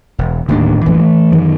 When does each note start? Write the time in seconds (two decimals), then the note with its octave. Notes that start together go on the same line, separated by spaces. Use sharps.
0.18 E1
0.49 D1 D#2 A2 D4
0.86 A#1 F#2 A2 E3
1.00 A3
1.32 F#2 D#3